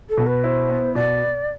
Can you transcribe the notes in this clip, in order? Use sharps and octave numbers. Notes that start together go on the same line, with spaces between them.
A4
B2
B4
E4 C5
B3
B2 D5